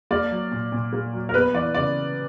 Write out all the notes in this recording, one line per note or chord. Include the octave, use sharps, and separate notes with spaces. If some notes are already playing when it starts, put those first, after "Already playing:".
A#3 D5
F#3
A#2
A#2
A#3
F#3
A#4
B3 B4
E3 D5
C#3 D5